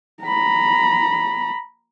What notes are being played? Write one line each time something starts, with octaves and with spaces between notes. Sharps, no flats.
A#5 B5